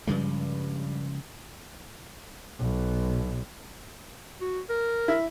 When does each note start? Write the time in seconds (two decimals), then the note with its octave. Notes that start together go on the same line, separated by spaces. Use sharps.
0.07 G2 C#3 F3 G#3
2.59 B1 B2
4.41 F#4
4.70 A#4
5.08 E4